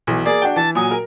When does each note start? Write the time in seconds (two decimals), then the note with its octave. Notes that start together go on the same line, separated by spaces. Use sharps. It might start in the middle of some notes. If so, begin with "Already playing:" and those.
0.07 B1 E3
0.25 A#3 G#4 D5
0.42 D4 F#4 G5
0.56 E3 A5
0.75 A#2 F#3 G#5 D#6
0.91 A#4